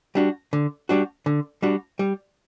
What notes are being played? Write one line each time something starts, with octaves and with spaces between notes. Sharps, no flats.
G3 D4 F#4
D3
G3 D4 F#4
D3
G3 D4 F#4
G3